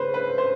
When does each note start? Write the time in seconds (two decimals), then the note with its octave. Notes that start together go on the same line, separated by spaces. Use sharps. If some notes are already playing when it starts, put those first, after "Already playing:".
Already playing: C#3 A3 C#4 B4 C5
0.14 B4
0.38 C5